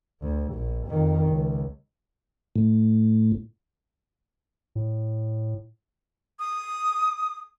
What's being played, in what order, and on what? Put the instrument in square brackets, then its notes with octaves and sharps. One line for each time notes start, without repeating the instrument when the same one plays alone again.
[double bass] D2
A#1
F2 D#3
C#2
[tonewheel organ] A2
[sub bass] A2
[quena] D#6